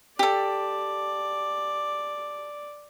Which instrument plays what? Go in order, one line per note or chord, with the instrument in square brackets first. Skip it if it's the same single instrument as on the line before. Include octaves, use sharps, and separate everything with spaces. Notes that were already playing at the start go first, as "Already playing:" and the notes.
[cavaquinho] G4 A4 [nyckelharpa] D5